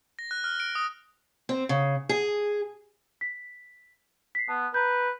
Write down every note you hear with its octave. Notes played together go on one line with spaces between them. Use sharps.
A#6
F#6
F6
D7
D#6
C4
C#3
G#4
B6
B6 C7
B3 A5
B4 A#5 G6